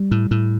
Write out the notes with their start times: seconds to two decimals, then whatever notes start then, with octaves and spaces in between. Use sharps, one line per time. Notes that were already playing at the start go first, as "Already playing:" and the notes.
Already playing: G3
0.11 A2
0.31 A2